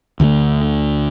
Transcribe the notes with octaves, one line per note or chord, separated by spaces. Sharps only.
D2 D3 E3 A3